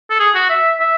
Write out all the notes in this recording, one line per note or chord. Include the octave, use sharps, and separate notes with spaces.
A4
G#4
F#4
E5
E5